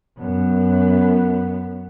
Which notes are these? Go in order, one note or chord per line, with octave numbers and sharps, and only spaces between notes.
F#2 B3